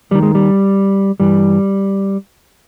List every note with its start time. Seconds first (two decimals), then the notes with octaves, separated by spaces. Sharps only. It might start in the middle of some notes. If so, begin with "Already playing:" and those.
0.11 D#2 D#3 G3
0.23 G#3
0.35 G3
1.20 G2 E3 G3